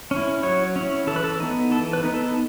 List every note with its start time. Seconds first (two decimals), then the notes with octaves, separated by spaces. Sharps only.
0.11 C#4 E4
0.43 F#3 C#5
0.76 C#4 E4
1.07 E3 A4
1.16 B4
1.24 A4
1.40 B3 D#4
1.71 E3 A4
1.93 B4
2.03 B3 D#4
2.14 A4